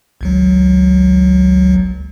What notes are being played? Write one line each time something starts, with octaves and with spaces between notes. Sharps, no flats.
G#1 C#2 F#3